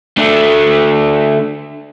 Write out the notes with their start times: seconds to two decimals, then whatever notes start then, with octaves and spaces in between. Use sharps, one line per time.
0.17 D3 A3